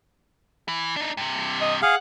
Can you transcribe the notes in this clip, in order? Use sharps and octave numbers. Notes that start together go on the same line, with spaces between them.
E3
D4 D#4
G2 C3
D#5
G#4 F5 F#5